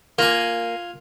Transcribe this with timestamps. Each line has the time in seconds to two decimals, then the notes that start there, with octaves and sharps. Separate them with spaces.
0.18 A#3 F4 G#5